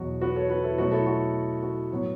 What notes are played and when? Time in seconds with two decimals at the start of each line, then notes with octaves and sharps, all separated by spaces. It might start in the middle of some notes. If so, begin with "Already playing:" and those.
Already playing: E2 B2 F#3 F#4
0.21 F#4 B4
0.36 A4 C#5
0.49 F#4 B4
0.63 E4 A4
0.77 B2 F#3 A3 F#4
0.92 E4 A4
1.06 F#4
1.62 F#4
1.91 A2 F#3 B3